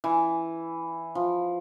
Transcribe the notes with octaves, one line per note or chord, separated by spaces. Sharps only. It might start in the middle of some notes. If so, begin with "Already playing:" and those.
E3
F3